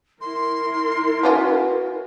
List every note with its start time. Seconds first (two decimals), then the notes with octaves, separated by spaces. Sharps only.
0.21 E4 A#4 C6
1.23 B3 C#4 F4 F#4 B4